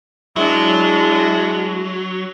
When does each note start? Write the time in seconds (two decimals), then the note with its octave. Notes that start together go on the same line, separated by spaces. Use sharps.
0.36 F#3 G#3 D4 E4